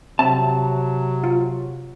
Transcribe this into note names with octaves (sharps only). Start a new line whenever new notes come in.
C3 F#3 C4 E5 A5
F4